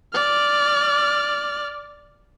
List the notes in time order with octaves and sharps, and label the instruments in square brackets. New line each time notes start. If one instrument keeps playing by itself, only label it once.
[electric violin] D5 F6